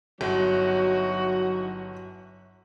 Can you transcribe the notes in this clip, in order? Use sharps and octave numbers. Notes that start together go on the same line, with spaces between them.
G1 F#3 D#4 E4 F#4